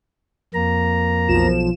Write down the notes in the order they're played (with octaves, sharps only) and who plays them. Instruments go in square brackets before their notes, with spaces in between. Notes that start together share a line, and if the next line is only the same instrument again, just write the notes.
[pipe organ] F2 A#3 A#5
[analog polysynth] B1 F3 E7